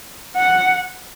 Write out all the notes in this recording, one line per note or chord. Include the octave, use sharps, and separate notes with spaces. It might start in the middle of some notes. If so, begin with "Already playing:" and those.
F#5